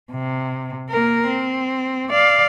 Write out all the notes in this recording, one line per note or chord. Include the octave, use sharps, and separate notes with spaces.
C3
A#3 A#4
C4
D5 F5